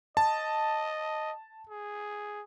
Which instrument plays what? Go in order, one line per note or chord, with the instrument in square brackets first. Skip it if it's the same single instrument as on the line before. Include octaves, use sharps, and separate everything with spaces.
[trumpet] D#5 [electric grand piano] A5
[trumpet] G#4